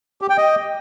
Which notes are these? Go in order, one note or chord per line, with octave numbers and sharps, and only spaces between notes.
G4
G5
D#5